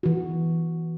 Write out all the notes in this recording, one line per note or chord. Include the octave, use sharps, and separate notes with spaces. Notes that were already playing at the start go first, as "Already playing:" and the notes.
E3 F#4